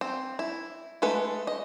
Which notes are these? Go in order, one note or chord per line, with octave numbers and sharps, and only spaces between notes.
C4
E4
G#3 A3 A4 B4
D#5